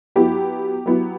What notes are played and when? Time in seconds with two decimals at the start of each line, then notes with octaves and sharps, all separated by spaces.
0.16 F#3 B3 E4 G4
0.86 F#3 B3 E4